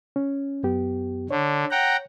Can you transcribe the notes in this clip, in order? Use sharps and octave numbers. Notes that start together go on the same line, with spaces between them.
C#4
F#2 B3 G4
D3 C#5
F#5 G5 A#5